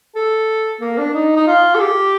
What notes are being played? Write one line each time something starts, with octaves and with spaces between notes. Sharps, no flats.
A4
A#3
D4
D#4
D#4
F4
A4
G4